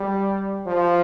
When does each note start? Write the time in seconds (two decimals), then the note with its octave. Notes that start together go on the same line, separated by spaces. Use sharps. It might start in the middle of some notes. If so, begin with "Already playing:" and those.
Already playing: G3
0.66 F3